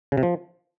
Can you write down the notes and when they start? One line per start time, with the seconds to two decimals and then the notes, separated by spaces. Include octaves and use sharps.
0.12 C#3
0.17 C3
0.23 F3